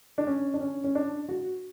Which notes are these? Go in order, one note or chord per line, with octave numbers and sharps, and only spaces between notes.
D4
C#4
D4
C#4
C#4
D4
F#4